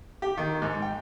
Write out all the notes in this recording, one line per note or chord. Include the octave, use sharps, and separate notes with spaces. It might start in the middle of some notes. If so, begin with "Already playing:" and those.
G4
D#3
G#2
G5